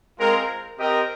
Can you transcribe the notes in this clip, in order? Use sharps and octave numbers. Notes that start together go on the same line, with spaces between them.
G#3 C4 F4 A#4
C4 G4 A#4 D#5 G5